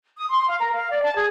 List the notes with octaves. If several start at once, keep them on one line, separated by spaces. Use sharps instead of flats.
D#6
C6
F5
A#4
F5
D5
A5
G#4